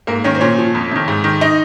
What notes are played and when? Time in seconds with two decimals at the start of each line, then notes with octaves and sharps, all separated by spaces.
0.07 G#2 A#3 A#4
0.24 D#3 C#4 C#5
0.35 C5
0.41 A#2 C#4 C#5
0.58 F3
0.75 F2
0.91 C3 D#3
1.08 G#2
1.24 D#3
1.41 D#4 D#5